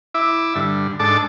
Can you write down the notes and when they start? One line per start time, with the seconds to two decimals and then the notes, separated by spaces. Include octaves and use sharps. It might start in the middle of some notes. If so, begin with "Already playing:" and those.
0.14 E4 E5 D6
0.56 G2 D3
1.00 G#2 D4 A4 A5 D6